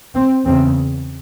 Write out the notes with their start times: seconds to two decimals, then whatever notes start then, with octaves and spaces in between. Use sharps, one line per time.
0.15 C4
0.45 E2 C#3 C4